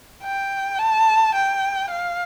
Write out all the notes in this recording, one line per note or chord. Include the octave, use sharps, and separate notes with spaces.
G5
A5
G5
F5